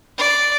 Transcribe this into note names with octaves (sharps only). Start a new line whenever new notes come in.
D5